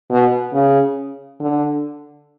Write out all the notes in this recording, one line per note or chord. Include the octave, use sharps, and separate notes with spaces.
B2
C#3
D3